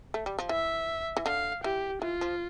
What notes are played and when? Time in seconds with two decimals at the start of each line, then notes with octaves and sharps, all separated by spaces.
0.14 A3
0.26 G3
0.39 F3
0.49 E3 E5
1.17 E3
1.26 D3 F5
1.64 E3 G4
2.02 E3 F4
2.21 F3